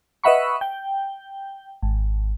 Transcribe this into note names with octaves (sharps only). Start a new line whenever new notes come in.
B4 D#5 E5 F#5 B5 C#6
G5
G#1